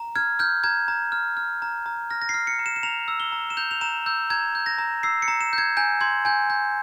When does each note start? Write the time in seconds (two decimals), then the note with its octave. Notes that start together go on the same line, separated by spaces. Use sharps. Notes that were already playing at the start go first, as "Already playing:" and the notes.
Already playing: A#5
0.15 F6 G#6
0.39 F6 G6
0.64 A#5 G#6
0.88 A#5
1.12 F6
1.37 F6
1.62 A#5
1.86 A#5
2.10 F6 A#6
2.22 A#6
2.29 C7
2.34 F6
2.47 C#7
2.59 A#5
2.66 E7
2.76 E7
2.83 A#5 F7
3.08 E6
3.20 G7
3.32 A#5
3.50 E7
3.57 G6 F7
3.71 F7
3.81 A#5 E7
4.06 E6 G6
4.30 A#5 G#6
4.55 G6
4.66 A#6
4.78 A#5
5.03 E6 C7
5.22 C#7
5.28 A#5
5.41 E7
5.53 G6
5.58 G#6
5.77 G#5 G6
6.01 C6 G#6
6.25 G#5 G6
6.50 G6